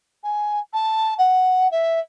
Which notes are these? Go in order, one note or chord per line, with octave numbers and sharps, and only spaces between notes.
G#5
A5
F#5
E5